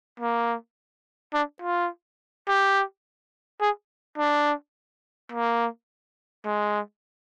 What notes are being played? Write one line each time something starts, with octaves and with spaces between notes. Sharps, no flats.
A#3
D4
F4
G4
G#4
D4
A#3
G#3